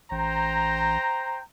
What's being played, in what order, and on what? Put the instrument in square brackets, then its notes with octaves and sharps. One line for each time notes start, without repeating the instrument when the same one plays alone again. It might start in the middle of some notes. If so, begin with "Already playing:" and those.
[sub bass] A1 [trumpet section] C5 G5 A#5